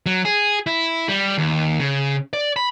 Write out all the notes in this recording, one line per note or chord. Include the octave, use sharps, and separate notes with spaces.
F#3
G#4
E4
G3
D#2
C#3
D5
B5